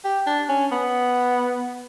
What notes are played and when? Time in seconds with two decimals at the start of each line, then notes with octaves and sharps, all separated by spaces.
0.04 G4
0.27 D4
0.49 C#4
0.72 B3